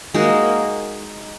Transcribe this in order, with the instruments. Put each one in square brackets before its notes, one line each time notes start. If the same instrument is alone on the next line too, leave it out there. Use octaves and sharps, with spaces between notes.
[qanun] G#3 D#4 F#4 [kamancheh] A#3